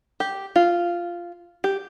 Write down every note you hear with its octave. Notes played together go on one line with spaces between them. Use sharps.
G4
F4
G4